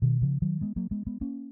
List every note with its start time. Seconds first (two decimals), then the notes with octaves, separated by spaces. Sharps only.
0.02 B2 D#3
0.22 C#3 F3
0.42 D#3 F#3
0.61 G#3 B3
0.76 F#3 A#3
0.91 G#3 B3
1.06 G#3 B3
1.21 A#3 C#4